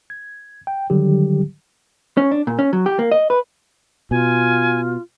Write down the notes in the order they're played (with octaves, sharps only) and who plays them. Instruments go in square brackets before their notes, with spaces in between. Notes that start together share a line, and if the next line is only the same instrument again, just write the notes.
[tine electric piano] G#6
G5
D3 D#3 F#3 G3 G4
[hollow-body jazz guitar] C#4
D4
A#2
C#4
F#3
G4
A#3
D#5
B4
[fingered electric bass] B2 [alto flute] F4 [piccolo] G#5